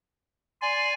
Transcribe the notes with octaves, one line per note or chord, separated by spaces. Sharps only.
D5 G#5 C6